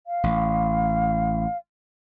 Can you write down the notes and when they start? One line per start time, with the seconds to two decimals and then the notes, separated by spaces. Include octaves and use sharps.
0.07 F5
0.24 A1